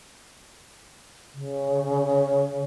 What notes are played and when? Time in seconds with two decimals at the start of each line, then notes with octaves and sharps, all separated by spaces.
1.34 C#3